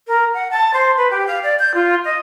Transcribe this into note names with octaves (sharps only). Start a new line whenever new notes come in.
A#4
F#5
A5
C5
B4
G4
F5
D5
G6
F4
D#5